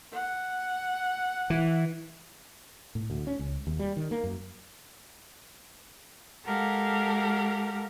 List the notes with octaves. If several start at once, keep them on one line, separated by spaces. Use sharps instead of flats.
F#5
E3
A2
D2
C#4
C#2
D#2
G3
D#3
A#3
F#2
G#3 G4 A4 A#4 F5 F#5